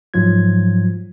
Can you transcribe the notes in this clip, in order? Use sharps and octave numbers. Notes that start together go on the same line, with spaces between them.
G#2 F3 F#3 F4 G#6